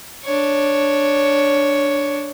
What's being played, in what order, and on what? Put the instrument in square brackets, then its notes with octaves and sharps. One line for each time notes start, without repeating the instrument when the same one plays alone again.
[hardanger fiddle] D4 C#5